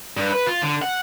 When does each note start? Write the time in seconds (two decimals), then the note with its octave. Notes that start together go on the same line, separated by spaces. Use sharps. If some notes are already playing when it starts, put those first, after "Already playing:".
0.17 G2
0.32 B4
0.46 F4
0.62 D3
0.82 F#5